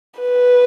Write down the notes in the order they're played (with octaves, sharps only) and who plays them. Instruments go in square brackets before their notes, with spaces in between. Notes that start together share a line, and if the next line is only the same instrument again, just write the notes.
[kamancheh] B4